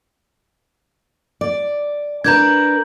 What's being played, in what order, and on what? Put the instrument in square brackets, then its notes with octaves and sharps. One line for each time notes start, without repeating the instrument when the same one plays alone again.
[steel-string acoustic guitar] D5
[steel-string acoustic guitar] D4 A#4 B4 [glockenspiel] A#5 G6 G#6